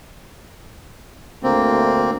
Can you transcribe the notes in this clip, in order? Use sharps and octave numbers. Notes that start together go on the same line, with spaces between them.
D2 A#3 C4